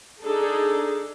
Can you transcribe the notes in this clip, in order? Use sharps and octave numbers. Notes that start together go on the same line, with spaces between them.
D4 D#4 G#4 A4